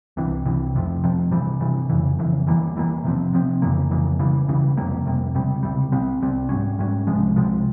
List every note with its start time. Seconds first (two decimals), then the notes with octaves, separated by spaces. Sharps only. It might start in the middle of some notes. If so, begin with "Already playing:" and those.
0.17 C2 C3 E3
0.46 C2 C3 E3
0.75 F2 C3 F3
1.04 F2 C3 F3
1.31 C3 E3 G3
1.61 C3 E3 G3
1.89 F2 C#3 E3
2.19 F2 C#3 E3
2.47 E2 E3 G3 A#3
2.76 E2 E3 G3 A#3
3.04 C3 F3 C4
3.33 C3 F3 C4
3.62 F2 C#3 E3 A#3
3.91 F2 C#3 E3 A#3
4.19 C#2 C#3 E3 G3
4.48 C#2 C#3 E3 G3
4.77 F2 C3 G3 A#3
5.06 F2 C3 G3 A#3
5.35 C#2 C3 G3
5.63 C#2 C3 G3
5.92 C2 C3 G3 C4
6.21 C2 C3 G3 C4
6.49 G#2 G3 C#4
6.79 G#2 G3 C#4
7.07 C2 C3 F3 G#3
7.36 C2 C3 F3 G#3